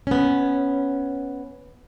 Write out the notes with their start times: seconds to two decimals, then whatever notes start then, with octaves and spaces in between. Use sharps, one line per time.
0.07 B3 C#4